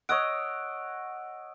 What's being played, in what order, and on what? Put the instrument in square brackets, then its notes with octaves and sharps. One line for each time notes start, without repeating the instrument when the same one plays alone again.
[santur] C#5 D#5 F#5 [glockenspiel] E6 D7